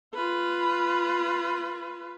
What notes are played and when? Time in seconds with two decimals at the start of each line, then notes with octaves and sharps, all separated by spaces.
0.14 F4 B4